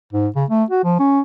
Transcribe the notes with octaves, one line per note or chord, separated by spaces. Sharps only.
G#2
C#3
A3
F#4
F3
C#4